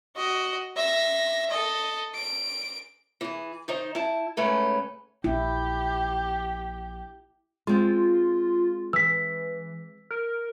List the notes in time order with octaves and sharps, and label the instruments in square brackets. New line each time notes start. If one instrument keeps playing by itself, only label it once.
[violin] F#4 D#5
E5 A#6
A4 D#5
D7
[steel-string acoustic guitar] E3 G#4
D#3 D#4 C5
E4 A5
G#2 C#3 A3 C#4 B4 A5
[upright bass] A#1 F3 [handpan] E4 [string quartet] G4
[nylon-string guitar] G#3 C4 [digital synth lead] F4
[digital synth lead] E3 [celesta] E6 B6
[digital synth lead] A#4